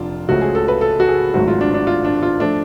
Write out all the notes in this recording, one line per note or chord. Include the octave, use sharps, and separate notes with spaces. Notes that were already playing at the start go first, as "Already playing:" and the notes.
Already playing: F1 D4 F4
C#2 C#3 F3 A3 F#4
G#4
A4
B4
A4
F#4
G#4
G#1 G#2 F#3 A3 F#4
F4
D4
D4
F4
D4
F4
F3 A3 D4